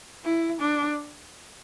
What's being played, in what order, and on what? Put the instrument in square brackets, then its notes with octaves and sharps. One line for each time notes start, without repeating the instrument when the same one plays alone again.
[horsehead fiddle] E4
D4